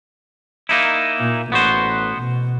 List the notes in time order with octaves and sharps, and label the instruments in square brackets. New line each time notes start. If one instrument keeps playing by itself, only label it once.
[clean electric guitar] A#3 D#4 E4
[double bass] A#2
[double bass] A1 [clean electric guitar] B3 F#4 C5
[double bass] B2